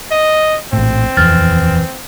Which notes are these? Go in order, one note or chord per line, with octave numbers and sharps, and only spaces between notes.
D#5
A#1 A2 C4
D#1 F2 E3 F6 A6